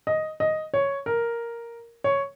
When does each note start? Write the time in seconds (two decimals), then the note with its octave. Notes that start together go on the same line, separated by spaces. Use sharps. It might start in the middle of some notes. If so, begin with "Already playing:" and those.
0.07 D#5
0.40 D#5
0.74 C#5
1.06 A#4
2.04 C#5